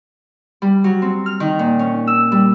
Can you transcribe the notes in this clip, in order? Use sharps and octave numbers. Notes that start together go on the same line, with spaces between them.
G3
F#3
C4
F6
D#3
A#2
C#4
E6
G3